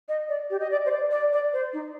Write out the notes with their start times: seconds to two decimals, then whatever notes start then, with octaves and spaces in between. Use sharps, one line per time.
0.09 D#5
0.29 D5
0.50 G4
0.60 D#5
0.71 D5
0.86 C5
0.91 D5
1.11 D5
1.33 D5
1.53 C5
1.73 D#4